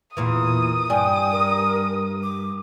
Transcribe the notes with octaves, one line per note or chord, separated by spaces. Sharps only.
E2 A#2 E3 D#6
G2 D5 G5 G#5
A#4
D6